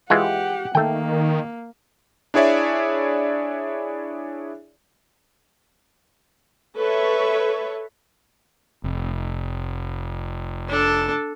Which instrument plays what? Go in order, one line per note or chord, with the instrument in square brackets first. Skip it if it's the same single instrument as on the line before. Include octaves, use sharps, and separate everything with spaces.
[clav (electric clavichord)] E3 G#3 F4 [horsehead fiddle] G4 F#5
[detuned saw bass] D#3 [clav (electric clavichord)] A3 G5 [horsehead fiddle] A#3
[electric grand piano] D4 E4 G#4 C#5 D5 E5
[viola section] A4 B4 C#5 E5
[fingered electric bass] F1
[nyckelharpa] D4 A4